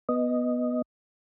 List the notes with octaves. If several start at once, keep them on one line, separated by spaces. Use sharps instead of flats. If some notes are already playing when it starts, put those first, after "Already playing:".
B3 D#5